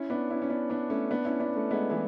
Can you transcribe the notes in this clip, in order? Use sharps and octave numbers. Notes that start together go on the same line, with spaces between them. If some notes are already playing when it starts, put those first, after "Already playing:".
Already playing: C#4 E4
B3 D4
C#4 E4
C#4
B3 D4
B3 D4
A3 C#4
B3 D4
C#4 E4
B3 D4
A3 C#4
G#3 B3
E3 G#3